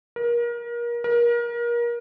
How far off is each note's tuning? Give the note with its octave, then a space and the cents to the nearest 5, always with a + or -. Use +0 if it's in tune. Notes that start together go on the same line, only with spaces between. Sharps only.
A#4 +30
A#4 +30